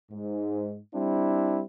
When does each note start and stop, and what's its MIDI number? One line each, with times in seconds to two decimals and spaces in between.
0.12 0.79 44
0.95 1.63 55
0.95 1.63 60
0.95 1.63 62
0.95 1.63 64